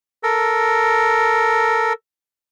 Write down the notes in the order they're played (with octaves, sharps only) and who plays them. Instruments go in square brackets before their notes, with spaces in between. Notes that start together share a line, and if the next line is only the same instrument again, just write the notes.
[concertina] A4 A#4